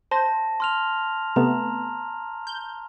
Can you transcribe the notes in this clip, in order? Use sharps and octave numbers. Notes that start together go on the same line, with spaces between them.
C5 A5 A#6
C6 F6 F7
C3 A3 B3 A#5
G6